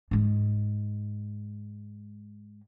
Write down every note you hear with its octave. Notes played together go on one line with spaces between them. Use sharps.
G#2 G#3